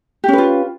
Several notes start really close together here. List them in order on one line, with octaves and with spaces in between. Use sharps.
G4 C#4 B4 F4